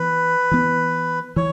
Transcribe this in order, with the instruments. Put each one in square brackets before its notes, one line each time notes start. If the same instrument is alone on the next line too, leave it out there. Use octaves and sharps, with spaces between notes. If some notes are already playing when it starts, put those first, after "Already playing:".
Already playing: [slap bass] E3 B3 [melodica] B4
[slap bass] E3 B3
[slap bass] E3 [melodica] C#5